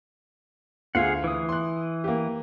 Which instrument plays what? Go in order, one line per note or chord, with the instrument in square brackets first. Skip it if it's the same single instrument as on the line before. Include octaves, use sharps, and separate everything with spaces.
[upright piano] D2 F4 C6 [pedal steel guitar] G#4 F5 F#5
[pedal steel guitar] E3 D#6
[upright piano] C6 F#6
A#3 G4